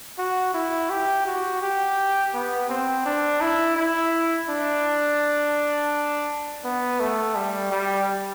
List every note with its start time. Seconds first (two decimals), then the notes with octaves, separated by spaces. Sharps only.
0.18 F#4
0.54 E4
0.90 G4
1.26 F#4
1.62 G4
2.34 B3
2.69 C4
3.06 D4
3.41 E4
3.76 E4
4.49 D4
6.64 B3
7.00 A3
7.35 G3
7.71 G3